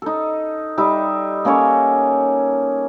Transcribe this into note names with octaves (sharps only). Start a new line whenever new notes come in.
D#4 A4
G3 D#4 E5
A#3 C#4 A4 C#5